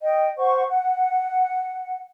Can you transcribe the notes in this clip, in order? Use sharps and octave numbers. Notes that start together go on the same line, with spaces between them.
D#5 G5
C5 F#5 C#6
F#5